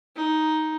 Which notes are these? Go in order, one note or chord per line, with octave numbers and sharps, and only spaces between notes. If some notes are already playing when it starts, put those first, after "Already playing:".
D#4